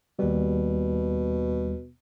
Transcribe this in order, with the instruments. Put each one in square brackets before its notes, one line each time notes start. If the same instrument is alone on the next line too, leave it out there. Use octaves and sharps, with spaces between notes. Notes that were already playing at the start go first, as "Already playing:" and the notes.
[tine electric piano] D#2 G3 [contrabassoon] B2